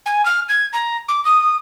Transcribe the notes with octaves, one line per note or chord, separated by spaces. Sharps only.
G#5
F6
G#6
A#5
D6
D#6